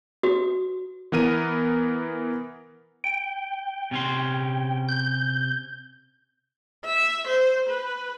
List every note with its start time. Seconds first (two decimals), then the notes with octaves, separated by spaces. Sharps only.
0.23 F#4
1.12 E3 B3 A#4 D#7
3.04 G5
3.91 C3 C#4 C6
4.89 G6
6.85 E5
7.27 C5
7.69 B4